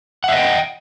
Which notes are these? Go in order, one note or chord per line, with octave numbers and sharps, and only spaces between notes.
D#5 E5 F#5 G5